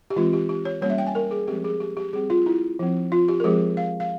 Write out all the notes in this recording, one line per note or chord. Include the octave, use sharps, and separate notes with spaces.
G4
E3 G#3 C4 F4
G4
G4
C#5
G3 A#3 C#4 C#5
E5
G5
G#5
A#4
G#4
F3 G#3 C4 G4
G#4
G4
G4
G3 C4 G#4
F4
E4
F3 C4
F4
G4
A#4
F3 G#3 C4 G#4
F5
F5